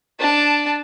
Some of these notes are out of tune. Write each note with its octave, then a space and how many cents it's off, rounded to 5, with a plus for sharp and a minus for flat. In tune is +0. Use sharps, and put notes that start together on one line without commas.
D4 +0 A5 +0